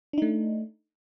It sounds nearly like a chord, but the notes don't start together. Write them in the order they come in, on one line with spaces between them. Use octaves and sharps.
D4 D#4 A3